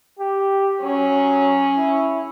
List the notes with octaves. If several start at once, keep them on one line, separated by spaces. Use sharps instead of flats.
G4
F#3 C#4 G#4
E4